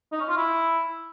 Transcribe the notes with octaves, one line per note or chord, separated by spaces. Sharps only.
D#4
C#4
F4
E4